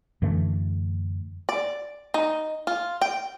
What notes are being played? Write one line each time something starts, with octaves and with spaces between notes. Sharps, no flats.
F#2 D3 E3 A3
D5
D#4
F4
G5